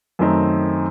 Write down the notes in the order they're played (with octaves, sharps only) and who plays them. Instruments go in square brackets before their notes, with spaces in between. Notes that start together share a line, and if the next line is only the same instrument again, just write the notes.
[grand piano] F#2 D#3 A3 C4 D#4